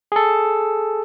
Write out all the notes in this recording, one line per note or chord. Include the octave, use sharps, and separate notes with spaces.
G#4 A4